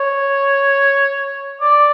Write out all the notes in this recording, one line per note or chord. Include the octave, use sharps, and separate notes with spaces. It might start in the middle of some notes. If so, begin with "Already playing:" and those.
Already playing: C#5
D5